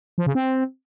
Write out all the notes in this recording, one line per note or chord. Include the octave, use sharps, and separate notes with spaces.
F3
C#3
C4